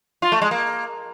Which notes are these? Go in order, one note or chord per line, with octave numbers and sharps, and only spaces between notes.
F4
A3
G#3
A#3